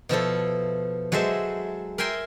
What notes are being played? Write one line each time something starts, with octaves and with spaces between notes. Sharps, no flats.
B2 F3 E4 A4
F#3 G#3 A4 C5 E5
A#4 E5 G5 G#5 C6